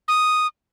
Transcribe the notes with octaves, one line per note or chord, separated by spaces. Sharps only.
D#6